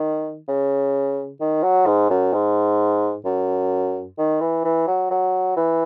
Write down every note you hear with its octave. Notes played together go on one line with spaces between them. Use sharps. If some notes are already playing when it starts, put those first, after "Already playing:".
Already playing: D#3
C#3
D#3
F#3
G#2
F#2
G#2
F#2
D#3
E3
E3
F#3
F#3
E3